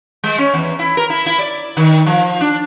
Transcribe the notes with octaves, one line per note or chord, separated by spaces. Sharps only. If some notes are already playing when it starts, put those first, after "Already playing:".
G#3
C#4
E2
E4
A#4
E4
E4
D5
D#3
F3
D4